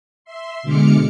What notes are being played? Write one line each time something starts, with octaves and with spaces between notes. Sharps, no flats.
E5 C6
B2 D3 G#3 D6 F6 C#7